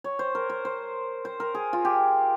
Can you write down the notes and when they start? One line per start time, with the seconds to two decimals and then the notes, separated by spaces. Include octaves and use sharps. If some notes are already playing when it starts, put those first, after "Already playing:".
0.04 C#5
0.19 C5
0.35 A#4
0.50 C5
0.65 C5
1.25 C5
1.40 A#4
1.55 G#4
1.73 F4
1.85 G4